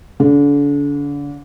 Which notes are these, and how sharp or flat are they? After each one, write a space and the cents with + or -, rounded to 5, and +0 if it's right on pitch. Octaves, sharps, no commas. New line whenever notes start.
D3 -40